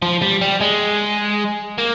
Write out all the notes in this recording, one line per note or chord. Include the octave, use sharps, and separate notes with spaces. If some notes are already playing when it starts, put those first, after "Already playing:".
F3
G3
G3
G#3
A#3